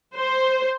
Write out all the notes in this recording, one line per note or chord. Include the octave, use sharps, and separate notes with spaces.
C5